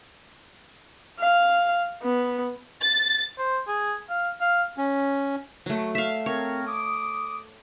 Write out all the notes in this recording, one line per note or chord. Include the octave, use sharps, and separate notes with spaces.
F5
B3
A6
C5
G#4
F5
F5
C#4
F#3 A3
E5 F5
C4 A#4 C#5
D6 D#6